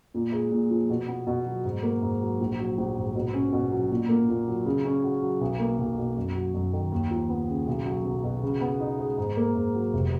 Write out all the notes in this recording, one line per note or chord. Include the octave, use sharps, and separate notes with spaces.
A#2
G#3
A#2
F3
B2
B3
B2
F#3
G#2
A#3
G#2
F#3
A#1
F#3
A#1
G#2
B2
C#4
B2
F#3
A#2
A#3
A#2
F#3
C#3
C#4
F#4
F#3
B1
A#3
B1
B2
F#2
F#3
F#2
D#3
D#2
F3
B3
C#3
B1
F#3
B1
B2
C#3
B3
D#4
G#3
G#2
A#3
G#2
F#3
F1